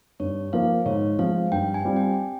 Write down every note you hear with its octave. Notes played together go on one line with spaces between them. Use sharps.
G2 C#5
F3 A#3 F5
G#2 C#5
F3 G#3 F5
G2 G5
G#5
G3 C4 F4
G5